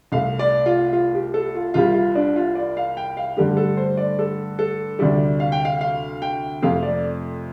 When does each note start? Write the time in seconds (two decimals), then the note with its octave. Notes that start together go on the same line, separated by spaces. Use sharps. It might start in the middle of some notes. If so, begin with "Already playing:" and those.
0.12 C2 C3 A3 F5
0.39 D5
0.66 F4
0.93 F4
1.14 G4
1.34 A4
1.55 F4
1.74 C2 C3 G3 F4
1.94 F4
2.15 D4
2.36 F4
2.56 D5
2.77 F5
2.97 G5
3.17 F5
3.37 G2 D3 A3 G4
3.57 A4
3.77 C5
3.97 D5
4.19 A4
4.59 A4
4.99 D2 C3 G3 D5
5.40 F5
5.52 G5
5.65 F5
5.81 F5
6.22 G5
6.62 F2 C3 A3 F5
6.83 D5